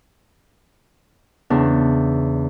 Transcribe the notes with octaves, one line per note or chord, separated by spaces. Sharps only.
E2 C#3 D4